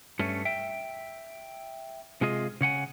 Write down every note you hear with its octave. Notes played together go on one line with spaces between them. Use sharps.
G2 A3 C#4
E5 G5
C3 G#3 F4 G#4 D#5
C#3 C#5 F#5 G#5